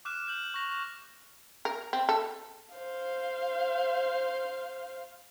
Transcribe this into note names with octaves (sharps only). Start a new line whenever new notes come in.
D6 F6 F#6 E7
F6 G6 F#7
C#6 A#6 F7
A#4
C4
A4
C5 F5